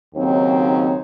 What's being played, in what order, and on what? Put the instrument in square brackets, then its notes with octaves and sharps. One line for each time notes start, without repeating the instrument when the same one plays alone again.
[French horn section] D#2 C#3 F#3 C4 D#4 C#5